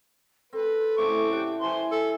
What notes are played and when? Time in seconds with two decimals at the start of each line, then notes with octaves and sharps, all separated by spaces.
0.53 C4 A4 B4
0.98 A2 C#3 A3 C4 C#6 D6
1.32 G4 D5 F#5 G5
1.61 E3 G3 A3 C5 G#5 C6
1.91 A4 E5